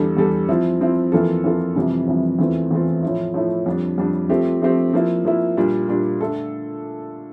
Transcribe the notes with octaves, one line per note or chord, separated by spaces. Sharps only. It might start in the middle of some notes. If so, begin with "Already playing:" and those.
Already playing: E2 D3 G3 D4 A4
E2 D3 G3 D4 A4
F3 C4 E4
F3 C4 E4
F2 E3 A#3 F4 A4
F2 E3 A#3 F4 A4
F2 C3 E3 G3
F2 C3 E3 G3
E2 E3 A3 C4 F4
E2 E3 A3 C4 F4
A2 F3 A3 E4
A2 F3 A3 E4
F2 D3 G3 D4
F2 D3 G3 D4
F3 A3 C4 G4
F3 A3 C4 G4
F3 A#3 E4
F3 A#3 E4
A#2 G3 D4
A#2 G3 D4
D3 A3 D4 A4